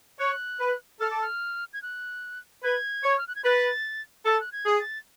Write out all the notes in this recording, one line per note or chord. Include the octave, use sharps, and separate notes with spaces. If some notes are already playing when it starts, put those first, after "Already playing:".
C#5 F#6
B4
A4 F6
D6
F6
G#6
F#6
B4 G#6
C#5
F6
F#6
G#6
B4 A6
A4 A6
F#6
G#6
G#4
A6